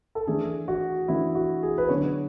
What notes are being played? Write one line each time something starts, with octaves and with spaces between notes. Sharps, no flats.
A4
E3 A3 D4 G#4
F#4
E3 A3 D4 E4
F#4
G#4
B4
D3 F#3 B3 D4 C#5